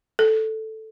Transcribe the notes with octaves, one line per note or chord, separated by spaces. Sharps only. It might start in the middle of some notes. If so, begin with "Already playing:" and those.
A4